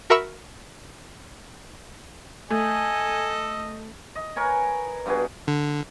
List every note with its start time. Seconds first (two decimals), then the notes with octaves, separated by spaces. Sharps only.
0.10 F#4 A#4 E5 B5 C#6 E6
2.50 A3 A4 D#5 G#5
4.15 D#5
4.36 A#4 B4 C#5 G#5
5.06 G2 B3 F#4 G#4
5.47 D3